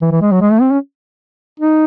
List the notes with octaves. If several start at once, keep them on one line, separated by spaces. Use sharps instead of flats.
E3
E3
G#3
F#3
G#3
A3
C4
C#4
D#4